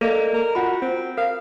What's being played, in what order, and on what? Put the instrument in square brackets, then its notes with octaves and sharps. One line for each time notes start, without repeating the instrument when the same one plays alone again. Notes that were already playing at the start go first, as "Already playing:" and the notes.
[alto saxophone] A#3 [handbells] A4 D5 D#5
[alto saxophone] A#4
[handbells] F4 F#5 B5 [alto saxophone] F#4
[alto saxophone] C4
[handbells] A#4 [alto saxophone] F5